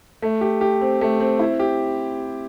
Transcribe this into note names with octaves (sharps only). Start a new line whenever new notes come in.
A3
G4
G4
C4
A3
C4
E4
G4